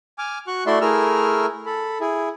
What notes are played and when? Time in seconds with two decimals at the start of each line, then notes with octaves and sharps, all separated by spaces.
0.18 G#5 D6 F6
0.47 F#4 C#6 F#6
0.66 A3 E4 F#4 D5 E5 C6
0.81 A3 E4 G#4 A#4 E6 F6
1.66 A4 B5
2.01 E4 G#4